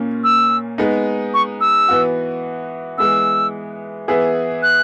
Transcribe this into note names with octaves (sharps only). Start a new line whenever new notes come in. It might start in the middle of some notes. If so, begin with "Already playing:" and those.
Already playing: A#2 A#3 C#4
E6
G#3 B3 D#4
C#6
E6
E3 B3 F#4
E3 G#3 B3 E6
E3 B3 E4 G#4
F#6